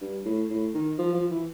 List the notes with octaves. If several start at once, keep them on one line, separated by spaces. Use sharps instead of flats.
G2
A2
A2
D#3
F3
F3
E3